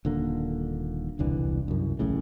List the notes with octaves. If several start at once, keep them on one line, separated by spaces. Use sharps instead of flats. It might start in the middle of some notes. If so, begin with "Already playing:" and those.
D#1 D3 A#3
E1 C2 D3 E3
C2 F#2
A1 F#2 A2 C#3